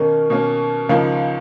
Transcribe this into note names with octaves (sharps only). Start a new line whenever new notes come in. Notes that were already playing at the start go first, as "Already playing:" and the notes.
Already playing: B2 D#3 A#3 C#4
B2 A#3 C#4
C#2 C#3 F3 A#3 D#4